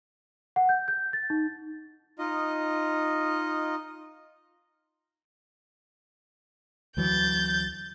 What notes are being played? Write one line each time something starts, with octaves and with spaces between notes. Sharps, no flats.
F#5
G6
G6
A6
D#4
D#4 F4 D#5
D2 E3 F#3 G6 A6